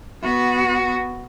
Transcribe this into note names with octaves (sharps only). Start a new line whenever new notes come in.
B3 F#4